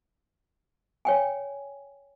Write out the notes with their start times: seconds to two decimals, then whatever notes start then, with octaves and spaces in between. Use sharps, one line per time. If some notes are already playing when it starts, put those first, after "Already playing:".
1.05 C#5 G5 G#5